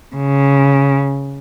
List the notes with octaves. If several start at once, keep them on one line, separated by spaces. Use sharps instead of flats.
C#3